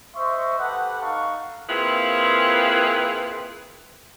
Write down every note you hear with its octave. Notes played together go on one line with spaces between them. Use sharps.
C5 D#5 E5 C6 C#6
G4 A4 B4 F#5
D#4 A4 F5 F#5 A5 C#6
A#3 C4 E4 F4 G#4 B4